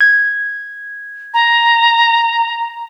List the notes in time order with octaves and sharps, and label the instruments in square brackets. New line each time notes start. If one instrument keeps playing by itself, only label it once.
[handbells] G#6
[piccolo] A#5